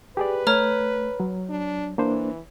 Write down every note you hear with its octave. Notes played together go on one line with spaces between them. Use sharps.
G4 G#4 B4 D5
A3 C#5 A#5 F6
F#3
D4
E3 A#3 D4 C5